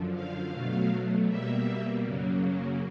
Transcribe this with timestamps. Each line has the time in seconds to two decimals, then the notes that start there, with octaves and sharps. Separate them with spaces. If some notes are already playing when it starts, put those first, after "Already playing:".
Already playing: F#2 D3 F3
0.13 F5
0.52 B2 F#3 A3
1.28 B2 G3 A#3 E5
2.04 F#2 C#3 F#3 A#3